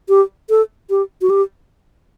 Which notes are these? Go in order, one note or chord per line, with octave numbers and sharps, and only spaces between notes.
G4
A4
G4
F#4
G4